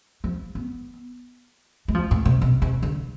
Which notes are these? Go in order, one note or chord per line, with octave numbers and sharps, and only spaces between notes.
F3
B3
G#3
F3
A2
C3
B2
C3
D3